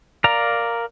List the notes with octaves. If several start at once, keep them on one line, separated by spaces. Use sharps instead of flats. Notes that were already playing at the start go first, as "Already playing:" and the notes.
A#4 D5 F5 A#5